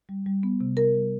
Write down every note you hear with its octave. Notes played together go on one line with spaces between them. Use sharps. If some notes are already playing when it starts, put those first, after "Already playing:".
G3
G3
B3
C3
C3 A#4
G3